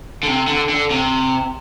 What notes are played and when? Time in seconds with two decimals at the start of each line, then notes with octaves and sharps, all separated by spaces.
0.23 D3
0.27 C3
0.47 D3
0.69 D3
0.91 C3